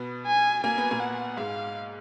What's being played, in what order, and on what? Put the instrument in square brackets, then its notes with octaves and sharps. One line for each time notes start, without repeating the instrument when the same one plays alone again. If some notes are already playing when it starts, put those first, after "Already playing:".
Already playing: [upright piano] B2 B3
[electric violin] G#5
[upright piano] A#3 [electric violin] G#5
[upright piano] B3
A#2 A#3
[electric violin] F#5
[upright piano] G#2 G#3 [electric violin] F5